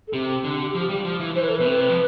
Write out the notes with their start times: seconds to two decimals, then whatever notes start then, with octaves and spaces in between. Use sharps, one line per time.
0.08 A4
0.13 C3 G4
0.44 D3
0.75 F3
0.89 G3
1.05 F3
1.20 E3
1.35 E3 C5
1.42 B4
1.49 A4
1.56 B2 B4
1.65 C3
1.89 F3